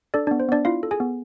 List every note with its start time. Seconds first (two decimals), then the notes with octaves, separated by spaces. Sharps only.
0.14 D4 A4 D5
0.27 B3 D4 D5
0.40 C5
0.49 B3 D4 D5
0.65 E4 F4 F5
0.83 A4
0.91 G#4 G#5
1.00 B3